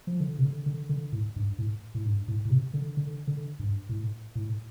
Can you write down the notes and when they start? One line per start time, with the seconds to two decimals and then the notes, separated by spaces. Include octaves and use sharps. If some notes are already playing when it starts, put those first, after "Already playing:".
0.07 F3
0.20 D3
0.39 C3
0.44 D3
0.66 D3
0.89 D3
1.12 A2
1.36 G2
1.58 A2
1.95 A2
2.06 G2
2.28 A2
2.45 A2
2.50 C3
2.74 D3
2.97 D3
3.27 D3
3.59 G2
3.89 A2
4.35 A2